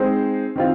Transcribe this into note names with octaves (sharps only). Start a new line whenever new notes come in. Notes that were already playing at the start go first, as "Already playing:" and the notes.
Already playing: G#3 C4 D#4 C5
D#3 C4 F4